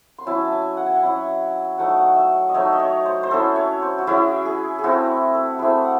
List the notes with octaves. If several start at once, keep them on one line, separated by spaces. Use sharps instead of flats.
C6
F#3 C#4 E4 A5
A5
G#5
F#5
G#5
F#5
F#3 C#4 E4
F#3 A3 D#4 F#5
F#5
E5
D#5
F#3 A3 D#4 C#5
E5
D#5
C#5
C5
C5
F#3 C#4 E4 A4
C#5
C5
F#4
F#3 C#4 E4 G#4
G#4
G#4
A3 C4 E4 F#4
A4
A3 C4 E4 G#4
F#5